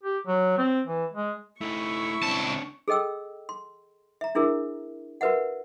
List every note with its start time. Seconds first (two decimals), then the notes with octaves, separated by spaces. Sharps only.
0.03 G4
0.27 F#3
0.58 C4
0.87 E3
1.13 G#3
1.61 A3 D#4 E4 C#6
2.23 C#2 C4 D4 A5
2.88 G#4 A4 D#5 G5 E6
3.49 C6
4.21 E5 A#5
4.35 D4 E4 G#4 A#4 E5
5.21 F#4 A#4 B4 E5 F#5